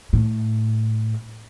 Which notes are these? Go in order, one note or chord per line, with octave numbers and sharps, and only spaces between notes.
A2